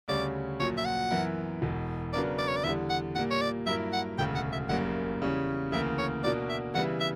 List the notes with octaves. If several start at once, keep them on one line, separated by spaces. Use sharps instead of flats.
D2 C#3 G3 C#4 D5
A#1 A#2 F#3 C#5
E5
F#5
F#2 E3 B3 E4 A#4
E1 E2 B2
C#3 F#3 B3 D4 A#4 D5
D5
C#5
D5
E2 D3 G3 E5
F#5
A#2 G3 A#3 F#5
C#5
D5
G2 F#3 A#3 E4 A#4 E5
F#5
E1 D2 C#3 G5
F#5
E5
F#1 F#2 C#3 G3 A#3 F#5
E2 C#3 G3 C#4
D2 C#3 E3 A#3 E5
C#5
B2 A#3 D4 F#4 A#4 D5
E5
C#3 E3 G3 B3 E4 F#5
E5